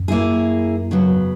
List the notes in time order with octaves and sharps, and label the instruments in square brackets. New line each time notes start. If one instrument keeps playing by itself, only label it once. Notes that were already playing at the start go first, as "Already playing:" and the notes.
Already playing: [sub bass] F#2
[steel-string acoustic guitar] A#3 E4 G#4
C#3 F#3 B3